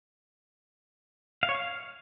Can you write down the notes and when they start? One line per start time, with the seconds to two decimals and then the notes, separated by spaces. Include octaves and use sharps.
1.43 F5
1.49 C#5
1.55 F5